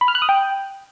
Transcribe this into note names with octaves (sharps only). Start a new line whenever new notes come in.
B5
F6
F#6
D#6
G5